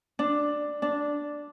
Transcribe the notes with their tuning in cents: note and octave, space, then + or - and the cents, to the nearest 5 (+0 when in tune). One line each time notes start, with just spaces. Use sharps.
D4 +5
D4 -5